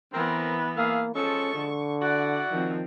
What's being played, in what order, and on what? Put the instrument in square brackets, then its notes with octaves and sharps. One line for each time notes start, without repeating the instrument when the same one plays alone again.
[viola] E3 B3 [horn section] C4 A#4
[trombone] A#3 [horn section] G#4 E5 F5
[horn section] F3 G#3 A4 [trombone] C#4 [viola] C#6
[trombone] D3
[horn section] E4 F#4 F#5 [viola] D5
[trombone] D#3 [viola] F3 C4